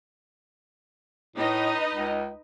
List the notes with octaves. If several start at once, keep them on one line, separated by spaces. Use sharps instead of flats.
A2 D#4 B4 D#5
C#2